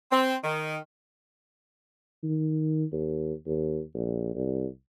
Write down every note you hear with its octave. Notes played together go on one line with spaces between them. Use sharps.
C4
D#3
D#3
D#2
D#2
A#1
C2